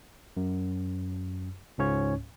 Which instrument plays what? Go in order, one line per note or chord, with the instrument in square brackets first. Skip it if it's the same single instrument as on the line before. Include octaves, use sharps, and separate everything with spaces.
[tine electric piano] F#2
C#2 G#2 C#4 C#5